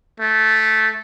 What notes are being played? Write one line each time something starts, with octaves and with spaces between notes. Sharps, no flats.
A3